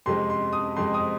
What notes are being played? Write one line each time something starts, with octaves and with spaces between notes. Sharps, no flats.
F2 C3 G#3 C6
C6
D#6
F2 C3 G#3 C6
D#6